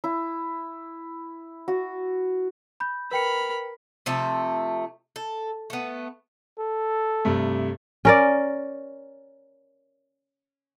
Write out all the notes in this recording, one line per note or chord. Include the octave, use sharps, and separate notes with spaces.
E4
F#4
B5 G6
A#4 B4 G5 B5 C#7
C3 F3 A3 E5
A4
A3 B3
A4
G2 C3 A3
C#4 A#4 D5